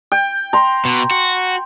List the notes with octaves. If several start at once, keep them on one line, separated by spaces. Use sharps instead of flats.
G5
A#5 C6
B2
F#4